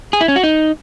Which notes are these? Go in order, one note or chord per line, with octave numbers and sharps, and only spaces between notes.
G#4
E4
C#4
F#4
D#4